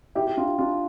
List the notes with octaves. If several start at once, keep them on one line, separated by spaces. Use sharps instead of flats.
E4 G4
G4
D4 F4
D4 F4